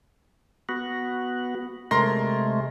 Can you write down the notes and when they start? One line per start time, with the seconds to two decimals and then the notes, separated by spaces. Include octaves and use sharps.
0.69 B3 F#4
1.91 C3 G#3 A3 A#4 C6 A#6